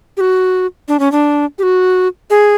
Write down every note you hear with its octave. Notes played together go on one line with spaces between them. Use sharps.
G4
F#4
D4
C#4
D4
G4
F#4
G#4